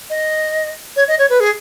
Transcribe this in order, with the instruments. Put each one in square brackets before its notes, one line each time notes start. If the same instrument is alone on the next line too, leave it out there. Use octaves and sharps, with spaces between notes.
[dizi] D#5
C#5
D#5
C#5
B4
G#4